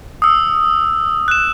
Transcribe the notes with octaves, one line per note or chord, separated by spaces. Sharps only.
D#6 E6
F#6 E7